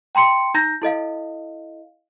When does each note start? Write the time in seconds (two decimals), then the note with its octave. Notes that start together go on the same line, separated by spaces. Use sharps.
0.15 G5 A#5 C6 C#7
0.54 D#4 A#5 G6 A#6
0.82 E4 A4 D#5 F5